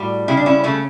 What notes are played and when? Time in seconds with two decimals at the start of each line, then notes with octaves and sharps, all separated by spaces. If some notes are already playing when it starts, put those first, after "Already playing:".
Already playing: A2 G3 F#4
0.28 C#3 E4 G4
0.37 D4
0.46 C#4 E4
0.64 C#3 A3 C#4